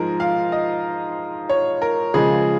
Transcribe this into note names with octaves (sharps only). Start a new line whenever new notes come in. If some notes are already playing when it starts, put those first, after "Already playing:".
Already playing: G#2 F3 G#3 A#4
F5
D#5
C#5
A#4
C#3 F3 G#3 G#4